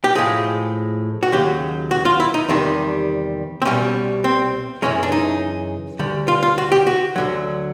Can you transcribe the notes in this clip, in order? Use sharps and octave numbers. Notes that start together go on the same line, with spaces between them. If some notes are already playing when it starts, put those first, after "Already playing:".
G4
A2 F3 G#3 G#4
F#4
D#2 C#3 F#3 G4
F#4
F4
E4
D#4
E2 C3 D#3 G3 D4
C4
C2 B2 G3 C#4
C4
F#2 C#3 E3 G#3 C#4
D4
D#4
D2 D3 G3
F4
F4
F#4
G4
F#4
D2 D3 F#3